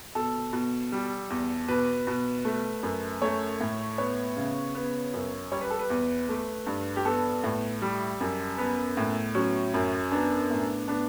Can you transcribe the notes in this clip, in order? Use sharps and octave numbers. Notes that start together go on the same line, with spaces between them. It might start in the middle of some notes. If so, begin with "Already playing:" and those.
B2 A4
B2
G3
E2
B2 B4
B2
A3
F#2
A3 C#5
A2
B3 C#5
C#3
B3
F#2
G3 C#5
B4
A4
B4
E2
A3
G2
G4
B3 A4
A2
G3
F#2
B3 B4
A2
F#3 C#4
F#2
B3 D4
A2
B3 D4